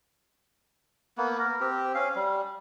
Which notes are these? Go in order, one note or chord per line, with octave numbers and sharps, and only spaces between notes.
A#3 B3
A#4
C4 G4
C#4 F5
G3